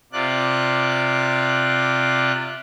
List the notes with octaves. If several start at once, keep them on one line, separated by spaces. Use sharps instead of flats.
C3 F4 D5 F#6